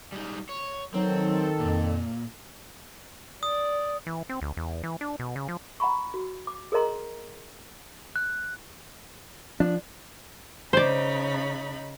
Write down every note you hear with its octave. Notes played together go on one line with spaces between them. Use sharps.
G3 G#3 D#4
C#5
D#3 F#3 C4 A4
F2 A#2
D5 D#6
E3
C4
D2
E2
E3
D4
B2
C#3
F3
F#5 A#5 B5 C#6
F#4
D6
G#4 A#4 C5 D#5 A#5 C6
F#6
F3 D4
C#3 D#4 C5 D5 B5